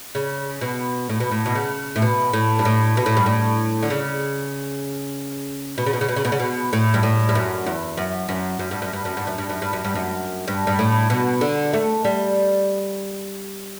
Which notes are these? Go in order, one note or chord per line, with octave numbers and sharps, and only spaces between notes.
C#3
B2
A2
B2
A2
B2
C#3
A2
B2
A2
G2
A2
B2
A2
G2
A2
D3
C#3
B2
C#3
B2
C#3
B2
C#3
B2
C#3
B2
A2
G2
A2
G2
F#2
E2
F#2
F#2
F#2
G2
F#2
G2
F#2
G2
F#2
G2
F#2
G2
F#2
G2
F#2
G2
G2
A2
B2
D3
A3
G3